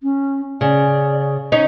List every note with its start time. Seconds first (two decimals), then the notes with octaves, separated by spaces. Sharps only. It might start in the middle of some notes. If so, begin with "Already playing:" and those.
0.03 C#4
0.61 C#3 D5
1.52 C#4 D#4